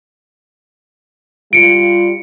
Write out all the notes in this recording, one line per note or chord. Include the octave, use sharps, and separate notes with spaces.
G3 F4 C#7 D7